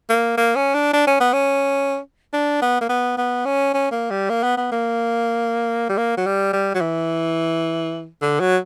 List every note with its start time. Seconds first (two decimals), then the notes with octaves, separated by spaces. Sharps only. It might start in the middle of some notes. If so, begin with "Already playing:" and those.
0.09 A#3
0.37 A#3
0.56 C#4
0.74 D4
0.93 D4
1.07 C#4
1.21 B3
1.33 C#4
2.33 D4
2.62 B3
2.81 A#3
2.89 B3
3.17 B3
3.45 C#4
3.74 C#4
3.92 A#3
4.10 G3
4.30 A#3
4.43 B3
4.57 B3
4.71 A#3
5.89 G3
5.97 A#3
6.17 F#3
6.26 G3
6.53 G3
6.75 F#3
6.81 E3
8.22 D3
8.40 F#3